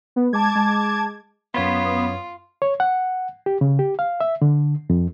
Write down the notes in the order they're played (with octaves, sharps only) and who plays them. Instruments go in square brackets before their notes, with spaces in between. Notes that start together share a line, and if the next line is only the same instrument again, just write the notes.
[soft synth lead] B3
[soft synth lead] G#3 [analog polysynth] A5 D6 G#6
[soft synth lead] G#3
[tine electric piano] F#2 C#5 C6 [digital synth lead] B3 [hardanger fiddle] F4
[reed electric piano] C#5
F#5
G4
C#3
G4
F5
E5
D3
F2